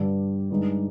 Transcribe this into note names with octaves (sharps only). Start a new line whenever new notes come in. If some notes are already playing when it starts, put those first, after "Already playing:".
Already playing: G2 D3 G3 D5
G2 D3 G#3 D#4